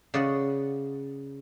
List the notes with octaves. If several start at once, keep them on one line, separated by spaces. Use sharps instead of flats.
C#3 D5 D#5 F#5